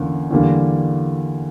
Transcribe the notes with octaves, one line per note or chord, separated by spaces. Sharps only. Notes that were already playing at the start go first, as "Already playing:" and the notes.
Already playing: E2 D3 A#3 C#4
E2 D3 G3 A#3